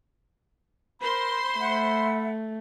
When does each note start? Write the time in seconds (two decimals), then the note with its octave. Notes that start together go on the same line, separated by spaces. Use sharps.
1.02 A#4 C5 B5 C6
1.59 A3 E5 F#5